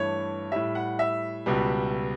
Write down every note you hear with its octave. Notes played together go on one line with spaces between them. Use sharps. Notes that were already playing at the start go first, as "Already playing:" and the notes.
Already playing: G2 E3 A3 C#5
A2 G3 E5
F#5
E5
C#2 B2 G3